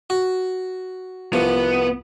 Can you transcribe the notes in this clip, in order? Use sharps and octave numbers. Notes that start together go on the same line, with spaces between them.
F#4
C2 F3 B3